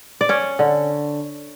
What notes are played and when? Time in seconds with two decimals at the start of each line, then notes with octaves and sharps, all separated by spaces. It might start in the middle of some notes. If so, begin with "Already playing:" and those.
0.21 D5
0.29 C#4 C#5
0.59 D3